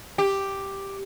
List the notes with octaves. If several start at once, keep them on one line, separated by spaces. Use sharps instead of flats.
G4